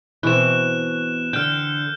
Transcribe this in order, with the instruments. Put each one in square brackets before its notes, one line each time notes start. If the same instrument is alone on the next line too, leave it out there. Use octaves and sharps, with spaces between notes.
[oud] B2 [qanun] E3 C4 [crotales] F#6 E7
[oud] D3 [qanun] G5 [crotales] F6 G6